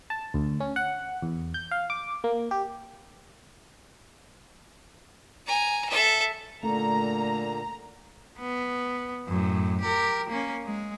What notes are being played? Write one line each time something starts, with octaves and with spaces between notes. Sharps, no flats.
A5
D2
C#4
F#5
E2
G6
F5
D6
A#3
G4
G#5 A#5
A4 E5
A#2 D3 A3 A#3 A#5
B3
F#2 A2
G4 A#4
A#3 C#4
G#3